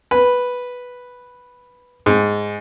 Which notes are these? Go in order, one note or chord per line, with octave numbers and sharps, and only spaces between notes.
B4
G#2